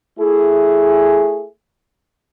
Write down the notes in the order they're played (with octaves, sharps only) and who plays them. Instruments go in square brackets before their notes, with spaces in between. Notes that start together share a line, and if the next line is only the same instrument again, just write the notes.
[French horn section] A3 E4 G#4